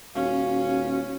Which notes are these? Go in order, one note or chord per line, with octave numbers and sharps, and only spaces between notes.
D#1 C#4 F#4 F5